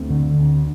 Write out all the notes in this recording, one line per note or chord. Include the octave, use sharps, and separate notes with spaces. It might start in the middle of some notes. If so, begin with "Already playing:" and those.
Already playing: D2 A3 C4
D3
D2